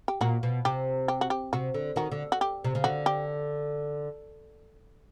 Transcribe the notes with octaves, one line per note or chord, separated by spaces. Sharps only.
G4
A#2 F#4
B2
C3 G4
G4
F#4
G4
C3 F#4
D3
D#3 F#4
D3
F#4
G4
C3
C#3
D3 F#4
G4